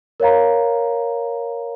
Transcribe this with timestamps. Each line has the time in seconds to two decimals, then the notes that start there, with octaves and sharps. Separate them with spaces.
0.20 A#4 C#5 F5 A#5